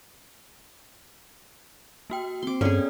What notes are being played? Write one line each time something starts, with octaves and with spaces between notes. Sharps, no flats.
A#3 F#4 G5
C4 C6 D6
G2 B3 C#4 G#4 A4 D5